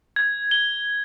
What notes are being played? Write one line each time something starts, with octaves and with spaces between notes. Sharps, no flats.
G#6
G7